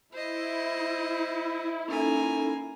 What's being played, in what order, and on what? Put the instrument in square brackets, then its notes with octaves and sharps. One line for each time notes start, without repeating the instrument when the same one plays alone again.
[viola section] E4 [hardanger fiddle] C5 D#5
[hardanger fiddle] A#3 G#5 [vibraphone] C#4 D#4 A4